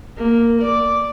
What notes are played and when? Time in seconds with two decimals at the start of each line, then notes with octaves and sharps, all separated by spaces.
0.17 A#3
0.61 D5 D6